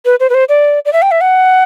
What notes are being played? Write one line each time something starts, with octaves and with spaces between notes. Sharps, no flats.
B4
C5
B4
C5
D5
D5
E5
G5
E5
F#5